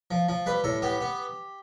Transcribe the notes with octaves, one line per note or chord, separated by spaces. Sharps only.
F3
F3
G3 B4
A2 A4
B3 G4
B3